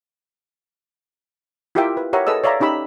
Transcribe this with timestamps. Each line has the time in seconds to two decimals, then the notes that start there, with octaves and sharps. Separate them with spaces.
1.75 E4 F4 G4 A#4 E5 G5
1.97 B4
2.13 G4 A#4 C#5 E5 F#5 A#5
2.27 G#4 A4 B4 D#5 E6
2.44 C#5 D5 E5 F5 A#5
2.60 C#4 D#4 G4 B5 E6